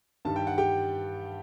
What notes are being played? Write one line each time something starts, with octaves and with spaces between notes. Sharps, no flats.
G2 D#3 G3 A5
G5
F#5
G4 G5